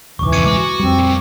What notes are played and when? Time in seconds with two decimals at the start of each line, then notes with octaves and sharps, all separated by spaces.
0.19 E1 C#2 G#2 E3 C#6 D6
0.32 F2 G#6 C#7 D#7
0.45 G#3 G#5 D6
0.57 F#4
0.80 F2 G3 C4
0.99 A#2